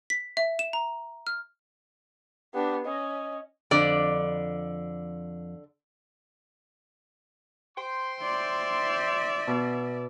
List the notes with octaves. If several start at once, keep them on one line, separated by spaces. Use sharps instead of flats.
B6
E5
E7
A#5
F6
B3 D4 G4
C#4 D#5
F2 D3 D5
C5 G5 C6
D5 E5
B2